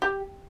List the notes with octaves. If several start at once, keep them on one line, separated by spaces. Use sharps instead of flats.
G4